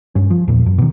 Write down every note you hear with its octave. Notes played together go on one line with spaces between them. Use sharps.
G2 C#4
F3
E2 A#2
F#2
B2 D#3